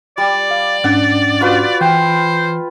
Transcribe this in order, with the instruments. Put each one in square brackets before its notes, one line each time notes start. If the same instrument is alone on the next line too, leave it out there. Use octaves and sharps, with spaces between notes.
[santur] G3 [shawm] D5
[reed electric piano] F5
[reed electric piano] G#2 C#4 D4 [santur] F#5
[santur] F4 F#4 B4
[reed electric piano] E3 [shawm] C5 [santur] G5